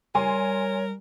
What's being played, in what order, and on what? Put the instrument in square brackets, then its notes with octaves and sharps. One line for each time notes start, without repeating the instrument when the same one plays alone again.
[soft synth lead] G3 [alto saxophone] A#4 [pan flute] C#5 [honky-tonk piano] G#5 C6